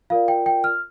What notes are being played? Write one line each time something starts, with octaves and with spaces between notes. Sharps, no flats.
F4 A#4 D5 F5
G5
G5
F6